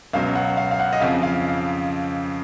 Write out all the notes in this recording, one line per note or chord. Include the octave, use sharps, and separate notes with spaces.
C#2 B2 F#3 F5
F#5
F5
F5
F#5
D#5
F2 C#3 F3 F5
F5